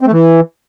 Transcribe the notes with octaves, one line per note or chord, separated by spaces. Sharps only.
C4
A3
E3